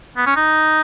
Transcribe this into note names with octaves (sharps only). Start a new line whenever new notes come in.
B3
C#4
D#4